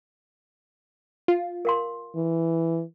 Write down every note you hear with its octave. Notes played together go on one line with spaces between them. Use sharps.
F4
A#4 F5 C6
E3